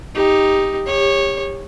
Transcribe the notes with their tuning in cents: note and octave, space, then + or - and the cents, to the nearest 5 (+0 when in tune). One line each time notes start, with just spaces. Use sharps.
D#4 +5 G4 +10
G4 +30 C#5 -10